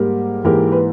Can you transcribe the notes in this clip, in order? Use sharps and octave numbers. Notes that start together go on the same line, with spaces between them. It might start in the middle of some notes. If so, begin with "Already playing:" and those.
Already playing: G#2 G3 A#3 G4 A#4
G#2 E3 A#3 G4 A#4
B4